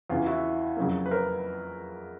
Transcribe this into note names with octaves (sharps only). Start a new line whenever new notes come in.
E2 C#3 E3 F4
E4 F#4
F2 C#3 F#3 A#3
B4
A#4 C5